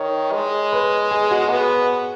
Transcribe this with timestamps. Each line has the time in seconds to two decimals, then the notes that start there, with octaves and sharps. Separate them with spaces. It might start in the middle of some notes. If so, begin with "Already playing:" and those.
Already playing: D#3 C#5
0.33 G#3
0.73 B4
1.11 G#4
1.31 F#4
1.50 B3